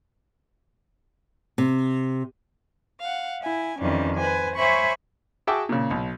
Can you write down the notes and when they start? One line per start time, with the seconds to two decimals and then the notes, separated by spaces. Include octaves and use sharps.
1.58 C3
3.01 F5 F#5
3.42 E4 G#5
3.81 F2 D#3 E3 G3 C#4
4.18 B4 C5 G#5
4.57 C5 C#5 E5 G#5 B5 C#6
5.47 F#4 G#4 E5 G5 A5 D6
5.69 A#2 C#3
5.91 B1